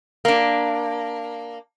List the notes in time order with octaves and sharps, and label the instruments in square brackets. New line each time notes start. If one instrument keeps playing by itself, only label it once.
[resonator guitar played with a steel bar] A#3 D4